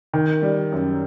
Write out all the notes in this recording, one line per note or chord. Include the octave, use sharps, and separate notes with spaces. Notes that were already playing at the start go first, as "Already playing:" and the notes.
D#3
G3
F#2